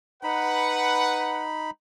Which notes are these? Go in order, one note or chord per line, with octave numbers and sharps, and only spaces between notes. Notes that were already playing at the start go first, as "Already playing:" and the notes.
D#4 B4 F#5 B5